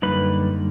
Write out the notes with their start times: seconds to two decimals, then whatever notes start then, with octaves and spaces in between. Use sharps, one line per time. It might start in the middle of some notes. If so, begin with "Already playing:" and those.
0.02 F#2 D3 G3 A#3 D#4 B4